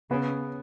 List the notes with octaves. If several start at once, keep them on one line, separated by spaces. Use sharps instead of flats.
C#3 B3